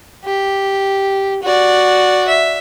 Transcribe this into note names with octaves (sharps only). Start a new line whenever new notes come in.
G4
F#4 D5
E5